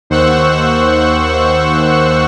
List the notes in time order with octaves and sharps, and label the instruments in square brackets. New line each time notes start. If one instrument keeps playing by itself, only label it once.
[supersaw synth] D#2 C5 F#5 C#6 E6 F#6